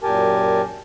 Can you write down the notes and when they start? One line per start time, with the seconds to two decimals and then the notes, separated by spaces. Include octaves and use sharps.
0.03 F#2 A#2 G4 A#4 G#5 A5